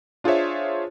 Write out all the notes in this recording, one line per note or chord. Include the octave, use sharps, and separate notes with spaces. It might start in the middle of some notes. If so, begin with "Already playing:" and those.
D4 F4 G#4 C5 C#5 E5